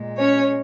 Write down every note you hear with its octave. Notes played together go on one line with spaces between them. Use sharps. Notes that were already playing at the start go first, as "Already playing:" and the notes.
Already playing: A#2 G#3
C#4 C#5